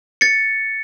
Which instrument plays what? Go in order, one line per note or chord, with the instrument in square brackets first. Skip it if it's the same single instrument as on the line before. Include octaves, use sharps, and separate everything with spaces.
[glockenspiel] A6 C#7